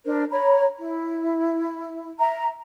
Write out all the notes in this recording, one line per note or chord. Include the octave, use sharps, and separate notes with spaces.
D4 A#4 C5
C#5 A#5 B5
E4
E5 A#5